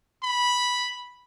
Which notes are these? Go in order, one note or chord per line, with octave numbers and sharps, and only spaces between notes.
B5